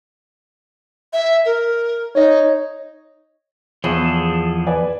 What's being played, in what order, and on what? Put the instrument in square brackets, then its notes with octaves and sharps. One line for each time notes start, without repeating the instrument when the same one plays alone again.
[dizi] E5
A#4
[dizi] D#4 [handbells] C#5 D#5
[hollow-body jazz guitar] E2 [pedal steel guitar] F3 G#4 A4
[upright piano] B4 D5 G#5